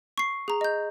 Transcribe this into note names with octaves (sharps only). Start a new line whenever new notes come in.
C#6 C7
G#4 A#5
D#5 G6